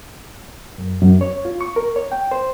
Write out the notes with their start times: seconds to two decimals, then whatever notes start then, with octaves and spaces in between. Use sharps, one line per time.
0.78 F#2
1.02 F#2
1.21 C#5
1.45 F4
1.61 C#6
1.76 A#4
1.96 C#5
2.12 G5
2.31 C5